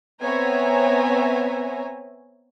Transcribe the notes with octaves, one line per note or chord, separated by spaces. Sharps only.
B3 C4 C#5 E5 G#5 A#5